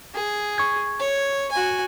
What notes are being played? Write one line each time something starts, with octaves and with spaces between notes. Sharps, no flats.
G#4
C#6 G#6
C#5
F#4 G#5